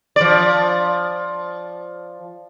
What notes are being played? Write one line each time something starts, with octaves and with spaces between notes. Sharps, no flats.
F3 D5